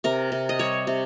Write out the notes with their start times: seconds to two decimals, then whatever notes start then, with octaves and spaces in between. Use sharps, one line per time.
0.04 C3 A#4
0.32 C3
0.49 D#5
0.59 G3 C#5
0.87 C3